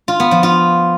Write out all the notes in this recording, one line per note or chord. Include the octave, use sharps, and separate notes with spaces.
F4
B3
F3
F4